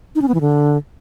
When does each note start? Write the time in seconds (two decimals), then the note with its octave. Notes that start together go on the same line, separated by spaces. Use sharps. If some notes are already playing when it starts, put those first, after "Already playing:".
0.15 D#4
0.22 C#4
0.28 B3
0.34 E3
0.41 D3